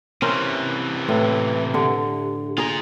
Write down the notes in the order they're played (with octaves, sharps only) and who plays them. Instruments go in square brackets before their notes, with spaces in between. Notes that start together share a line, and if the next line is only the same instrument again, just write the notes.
[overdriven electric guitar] C3 E3 [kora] C#4 A#4 C5
[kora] A2 [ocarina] B4
[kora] D3 [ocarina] G4
[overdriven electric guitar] F4 A#5 [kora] G#4 D#5